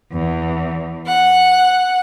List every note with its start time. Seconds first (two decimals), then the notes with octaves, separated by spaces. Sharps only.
0.13 E2
1.06 F#5